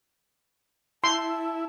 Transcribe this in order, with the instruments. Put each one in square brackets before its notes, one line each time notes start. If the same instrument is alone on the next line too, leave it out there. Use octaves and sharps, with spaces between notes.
[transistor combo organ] E4 [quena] A5 [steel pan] C6